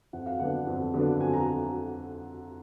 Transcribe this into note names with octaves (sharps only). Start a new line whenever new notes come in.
F2 F#5
F5
D3 F#3 B3 D4 F#5
F2
D3 F#3 B3 D4
F2 G#5
A#5